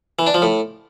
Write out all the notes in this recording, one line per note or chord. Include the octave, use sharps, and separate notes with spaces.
E3
D4
F3
A2